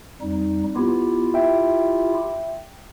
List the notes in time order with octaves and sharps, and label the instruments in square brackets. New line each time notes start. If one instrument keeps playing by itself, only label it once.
[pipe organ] F2 G3 D#4
[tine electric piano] B3 [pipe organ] E4 F4 G4
[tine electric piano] E5 G5